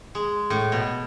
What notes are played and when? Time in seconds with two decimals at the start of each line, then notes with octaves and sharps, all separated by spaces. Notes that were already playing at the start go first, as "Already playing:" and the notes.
0.15 G#3
0.50 A2
0.72 B2